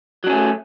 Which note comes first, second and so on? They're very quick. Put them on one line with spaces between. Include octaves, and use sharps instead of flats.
F#3 D4 C#4 A3